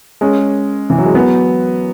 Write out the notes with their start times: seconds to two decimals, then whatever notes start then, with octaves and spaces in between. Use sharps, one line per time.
0.21 G#3 C#4
0.90 E3
0.98 F#3
1.06 G#3
1.14 F#3 B3